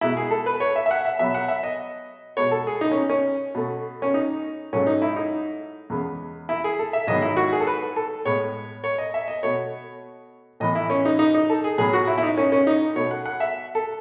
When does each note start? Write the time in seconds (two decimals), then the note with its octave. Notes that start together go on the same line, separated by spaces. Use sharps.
0.01 B2 G#3 B3 E4
0.17 G#4
0.31 A4
0.46 B4
0.60 C#5
0.76 E5
0.86 E5
0.91 F#5
1.05 E5
1.19 B2 F#3 B3 E5
1.34 F#5
1.48 E5
1.63 D#5
2.37 B2 G#3 B3 C#5
2.51 A4
2.67 G#4
2.81 D#4
2.92 C#4
3.10 C#4
3.55 B2 A3
4.02 C#4
4.14 D#4
4.73 G#2 F#3 A3 C#4
4.87 D#4
5.02 E4
5.16 D#4
5.90 E2 C#3 G#3 B3
6.49 E4
6.64 G#4
6.79 A4
6.93 E5
7.07 G#2 D#3 F#3 B3 D#5
7.22 E4
7.37 F#4
7.52 G#4
7.60 A4
7.67 B4
7.96 A4
8.25 A2 G#3 B3 C#5
8.84 C#5
8.98 D#5
9.14 E5
9.28 D#5
9.43 B2 A3 C#5
10.60 A2 E3 B3 D#5
10.75 E4
10.90 C#4
11.05 D#4
11.19 D#4
11.34 D#4
11.50 A4
11.64 G#4
11.78 A2 F#3 B3 G#4
11.93 F#4
12.07 E4
12.18 E4
12.23 D#4
12.38 C#4
12.52 C#4
12.67 D#4
12.95 B2 A3 C#5
13.11 F#5
13.26 F#5
13.40 E5
13.75 A4